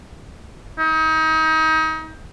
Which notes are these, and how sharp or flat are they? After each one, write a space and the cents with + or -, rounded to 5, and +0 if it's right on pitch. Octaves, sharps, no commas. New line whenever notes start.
D#4 +30